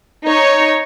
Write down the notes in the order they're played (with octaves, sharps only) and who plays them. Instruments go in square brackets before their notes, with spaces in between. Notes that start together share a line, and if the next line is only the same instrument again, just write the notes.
[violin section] D#4 C#5